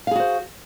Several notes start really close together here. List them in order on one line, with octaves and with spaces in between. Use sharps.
F5 G#4 F#4 C5